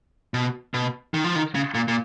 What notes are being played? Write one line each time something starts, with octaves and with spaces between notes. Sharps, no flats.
B2
B2
D#3
F3
D#3
C#3
A#2
A#2